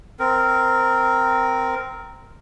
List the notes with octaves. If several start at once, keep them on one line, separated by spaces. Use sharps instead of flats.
C4 A#4